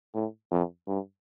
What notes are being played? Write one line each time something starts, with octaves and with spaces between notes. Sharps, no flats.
A2
F2
G2